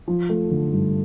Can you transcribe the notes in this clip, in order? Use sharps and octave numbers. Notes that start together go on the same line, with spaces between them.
F3
A3
D3
G2